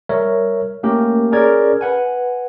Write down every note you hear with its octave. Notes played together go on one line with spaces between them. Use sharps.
G3 A#4 C#5 E5
A3 A#3 C#4 G4 A#4
C#4 G#4 A#4 D5 G#6
B4 F#5 G#5